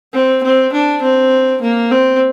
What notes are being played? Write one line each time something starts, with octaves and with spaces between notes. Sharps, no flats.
C4
C4
D4
C4
A#3
C4